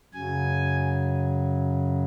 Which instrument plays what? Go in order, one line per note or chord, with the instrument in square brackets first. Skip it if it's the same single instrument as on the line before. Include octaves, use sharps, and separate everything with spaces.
[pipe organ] F#2 C#3 F#3 G#5